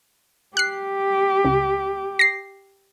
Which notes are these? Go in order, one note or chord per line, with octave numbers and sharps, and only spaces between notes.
G4 F#6 C7
C#2
A#6 C7